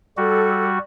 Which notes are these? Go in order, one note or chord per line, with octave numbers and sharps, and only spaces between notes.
G3 F#4 A4